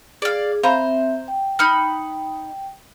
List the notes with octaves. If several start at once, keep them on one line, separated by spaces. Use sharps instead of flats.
G#4 D5 F5
C4 C5 E5 F5 A#5 B5
G5
D#4 B5 F6 F#6